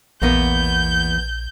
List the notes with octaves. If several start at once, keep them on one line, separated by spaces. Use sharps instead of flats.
A#1 E2 A#3 B3 G6